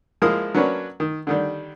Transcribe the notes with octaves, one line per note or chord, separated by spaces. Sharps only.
F3 G#3 A#3 E4 A#4 D#6
F#3 A#3 C#4 D4 B4
D#3
D3 D#3 G3